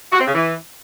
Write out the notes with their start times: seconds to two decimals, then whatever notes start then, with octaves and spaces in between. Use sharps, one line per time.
0.12 F#4
0.19 C4
0.27 C#3
0.34 E3